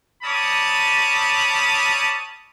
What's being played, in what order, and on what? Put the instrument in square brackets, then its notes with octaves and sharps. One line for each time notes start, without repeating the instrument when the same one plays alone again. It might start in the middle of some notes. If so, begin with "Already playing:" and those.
[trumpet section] G3 C#5 A5 B5 D6 D#6